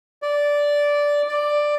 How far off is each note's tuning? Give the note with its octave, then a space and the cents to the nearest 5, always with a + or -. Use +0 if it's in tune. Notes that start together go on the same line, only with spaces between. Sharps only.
D5 -10
D5 +5